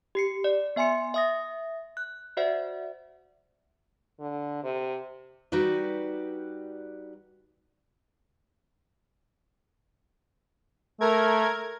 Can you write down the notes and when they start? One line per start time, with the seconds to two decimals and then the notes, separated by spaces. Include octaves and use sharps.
0.15 G4 C7 C#7
0.44 D5
0.76 B3 E5 G#5 C6 C#7
1.14 E5 D#6 A#6
1.97 F#6
2.37 F#4 C5 D5 E5 F#5
4.20 D3
4.64 C3
5.52 G3 D#4 F#4 G4 B4 D5
11.01 A3 A#4 G#6